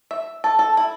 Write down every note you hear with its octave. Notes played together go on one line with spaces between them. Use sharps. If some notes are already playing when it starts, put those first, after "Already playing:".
E5
A4
A4
E4